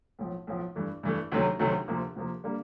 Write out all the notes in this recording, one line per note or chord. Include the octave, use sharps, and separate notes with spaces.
B1 A2 F3
B1 A2 F3
G2 E3 A3
G2 E3 A3
D2 C3 D#3 F#3 A3
D2 C3 D#3 F#3 A3
D2 C3 F3 A#3
D2 C3 F3 A#3
D3 G3 A#3